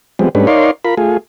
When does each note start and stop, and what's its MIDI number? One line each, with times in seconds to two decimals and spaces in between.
0.19 0.29 53
0.19 0.29 55
0.19 0.29 56
0.19 0.29 59
0.19 0.29 60
0.35 0.47 44
0.35 0.47 55
0.35 0.47 57
0.35 0.47 61
0.35 0.47 62
0.35 0.47 71
0.47 0.71 63
0.47 0.71 70
0.47 0.71 73
0.47 0.71 74
0.47 0.71 77
0.47 0.71 84
0.85 0.95 65
0.85 0.95 70
0.85 0.95 83
0.97 1.17 57
0.97 1.17 65
0.97 1.17 68